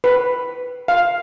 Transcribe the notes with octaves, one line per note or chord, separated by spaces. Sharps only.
B4
F5